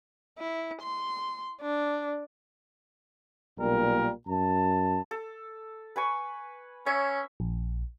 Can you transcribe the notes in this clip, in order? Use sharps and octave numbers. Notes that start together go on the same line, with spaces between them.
E4
C6
D4
B1 A#2 G3 A#4
F#2 A5
A4
B4 G#5 C#6
C#4 C#5 E5
A#1